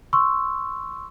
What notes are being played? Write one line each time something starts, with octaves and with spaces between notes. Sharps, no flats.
C6 C#6 E6